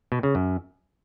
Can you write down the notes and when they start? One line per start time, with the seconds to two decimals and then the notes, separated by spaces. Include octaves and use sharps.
0.12 B2
0.23 C#3
0.35 F#2